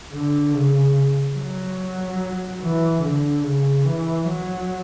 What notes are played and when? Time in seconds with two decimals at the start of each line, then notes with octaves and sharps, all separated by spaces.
0.13 D3
0.54 C#3
1.36 F#3
2.61 E3
3.03 D3
3.44 C#3
3.85 E3
4.27 F#3